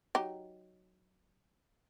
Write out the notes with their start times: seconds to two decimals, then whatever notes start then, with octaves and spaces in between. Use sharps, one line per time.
0.15 F#3 D#4 G4